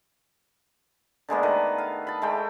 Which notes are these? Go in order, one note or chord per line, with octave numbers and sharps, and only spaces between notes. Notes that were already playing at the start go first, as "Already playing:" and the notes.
D3 G#3 A#3 B3
D#3 A3 B4
F5
A5 B5
G#3 A3 G5